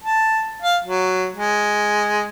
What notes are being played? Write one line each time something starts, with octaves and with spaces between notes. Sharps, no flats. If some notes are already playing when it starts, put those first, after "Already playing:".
A5
F5
F#3
G#3